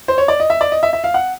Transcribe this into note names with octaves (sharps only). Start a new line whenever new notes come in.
C5
C#5
D5
D#5
E5
D5
D#5
E5
E5
F5
F#5